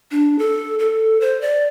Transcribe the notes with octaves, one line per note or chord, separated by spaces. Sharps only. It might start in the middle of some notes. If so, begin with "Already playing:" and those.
D4
A4
A4
C5
D5